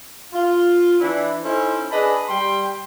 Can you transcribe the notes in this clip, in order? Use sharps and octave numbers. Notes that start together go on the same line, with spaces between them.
F4
E3 D4 E4
C#4 D#4 E4 A4 C5
D4 G#4 B4 D#5 A5 B5
G3 G5 C6